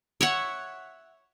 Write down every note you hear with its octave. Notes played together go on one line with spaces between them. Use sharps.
C#5 E5 F#5